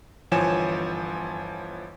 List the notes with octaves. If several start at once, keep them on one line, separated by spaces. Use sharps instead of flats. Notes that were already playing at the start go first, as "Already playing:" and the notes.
G1 E3 F3 C#5 G#5 E7